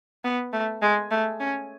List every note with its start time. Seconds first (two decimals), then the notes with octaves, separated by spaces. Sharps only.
0.24 B3
0.53 A3
0.82 G#3
1.11 A3
1.40 C#4